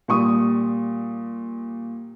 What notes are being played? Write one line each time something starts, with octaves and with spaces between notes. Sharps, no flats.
A#2 G3 C#6 D#6